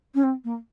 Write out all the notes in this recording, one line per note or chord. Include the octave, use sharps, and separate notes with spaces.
C#4
C4
A#3